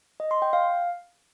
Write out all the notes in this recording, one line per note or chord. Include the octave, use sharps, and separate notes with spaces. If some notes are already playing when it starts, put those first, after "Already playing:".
D#5
C6
G5
F5